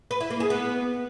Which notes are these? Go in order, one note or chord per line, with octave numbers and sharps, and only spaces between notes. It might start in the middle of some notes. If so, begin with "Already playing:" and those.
B4
E4
A#3
G#4
B3